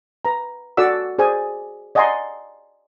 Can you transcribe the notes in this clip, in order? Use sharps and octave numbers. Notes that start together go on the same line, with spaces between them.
B4 A#5
F#4 A4 D5 F#5 E6
G#4 C5 D5 G#5
D5 D#5 F#5 G#5 A#5 C6